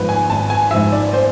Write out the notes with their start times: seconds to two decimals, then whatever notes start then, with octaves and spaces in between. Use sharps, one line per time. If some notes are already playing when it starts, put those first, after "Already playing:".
Already playing: G#1 G#2 F3 B4
0.09 G#5
0.29 G#1 A5
0.50 G#5
0.71 G#2 F3 E5
0.92 D5
1.13 C5